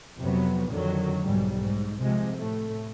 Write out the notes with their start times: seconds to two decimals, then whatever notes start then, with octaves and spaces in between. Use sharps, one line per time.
0.18 F2 C3 F#3 B3
0.68 F2 D3 D#3 F#3
1.23 B1 G#2 G3
1.58 G#2
2.02 C3 F3 G#3
2.36 A2 A3